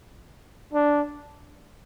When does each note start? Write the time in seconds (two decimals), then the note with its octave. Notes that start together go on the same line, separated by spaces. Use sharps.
0.73 D4